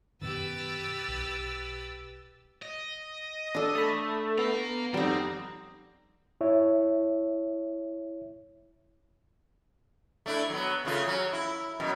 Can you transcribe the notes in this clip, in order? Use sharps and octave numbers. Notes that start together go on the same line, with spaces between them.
F#2 B2 D#3 G4 B4 E6 A6
B1
D#5
D4 A4
A3 A5 B5
B3 F5 A#5
F2 D3 G3 C4 D#4 C5
E4 C#5 E5
A3 D4 E4
F#3 B3
C#3 A3 F4
F#3
E4
F#2 B2